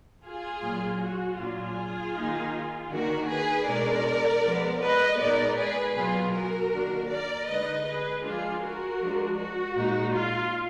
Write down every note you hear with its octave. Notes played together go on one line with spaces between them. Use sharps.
F4 G#4
A#2 F#3 A#3
F#4
A#2 F#3 D4 F4 G#4
D#3 A#3 D#4
D#3 A#3 D4 F#4 A#4
G#4 B4
B2 G#3 D4 A#4 D5
F3 G#3 B3
B4 D#5
A#2 G#3 B3 D#4 A#4 D5
G#4 B4
B2 F#3 B3 F4 G#4
F#4 A#4
D#3 A#3 D4
A#4 D5
D3 G#3 D#4 B4 D#5
G#4 B4
F3 G#3 D4 F4 G#4
F#4 A#4
F3 G#3 D4
F#4
A#2 G#3 D#4
F4